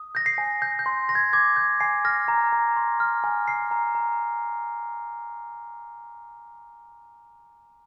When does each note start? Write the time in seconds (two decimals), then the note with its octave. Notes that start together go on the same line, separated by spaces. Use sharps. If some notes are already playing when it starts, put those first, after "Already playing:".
Already playing: D#6
0.15 G6 A#6
0.26 C7
0.38 G#5
0.62 G6 A#6
0.79 G6
0.86 C6
1.09 C6 A#6
1.15 G#6
1.33 D6 G#6
1.57 G6
1.80 G#5 C7
2.05 F6 A#6
2.28 A#5
2.53 A#5
2.77 C6
3.00 F6
3.24 G#5
3.48 F6 C7
3.71 A#5
3.95 A#5